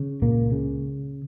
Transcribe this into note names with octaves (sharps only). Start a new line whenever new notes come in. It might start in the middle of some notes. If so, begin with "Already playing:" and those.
Already playing: C#3
C#2 A#2 A#3
C#3